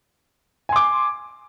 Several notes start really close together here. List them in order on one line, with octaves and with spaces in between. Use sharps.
G#5 C6 D6